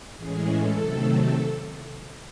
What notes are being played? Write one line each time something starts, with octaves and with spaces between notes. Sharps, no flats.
A2 E3 G#3 C#4 G#4
A4
C3 D#3 F#3 A3 C4
A4